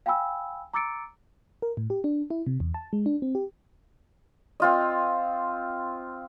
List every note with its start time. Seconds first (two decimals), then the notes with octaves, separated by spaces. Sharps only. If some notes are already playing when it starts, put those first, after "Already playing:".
0.06 F5 G5 G#5 B5 E6
0.74 A#5 D6 E6 A6 C#7 D7
1.62 A#4
1.77 A2
1.90 G4
2.04 D4
2.30 E4
2.46 C3
2.60 E2
2.74 A5
2.93 G#3
3.06 D4
3.22 C4
3.35 G4
4.60 C4 F4 D#5